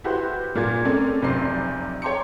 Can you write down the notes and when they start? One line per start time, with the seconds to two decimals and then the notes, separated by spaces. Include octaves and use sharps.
0.04 E4 F#4 G4 B4 C5
0.55 B1 A#2 A#3 F4 G#6
0.85 G#3 A3 C4 C#4 A#4 D5
1.22 F1 B1 C3 C5 D5 C7
2.02 C#5 G5 A#5 C6 D6 C#7